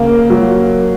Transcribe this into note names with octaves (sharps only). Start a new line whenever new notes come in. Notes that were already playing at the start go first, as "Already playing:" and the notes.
Already playing: C#3 A#3
F#3